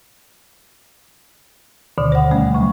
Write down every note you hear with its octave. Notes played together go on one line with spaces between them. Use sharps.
D2 B2 D3 D#3
C5 F#5
D#2 G3 A3 C#4
C#3 F#3